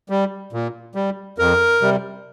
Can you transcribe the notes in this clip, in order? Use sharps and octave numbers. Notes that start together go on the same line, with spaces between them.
G3
A#2
G3
F2 A#4
C3 G3